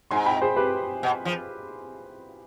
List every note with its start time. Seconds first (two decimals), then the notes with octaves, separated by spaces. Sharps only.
0.11 G#2 G#5 C6
0.26 G5 B5
0.42 G#4 C5
0.56 G4 B4
1.03 B2
1.25 F3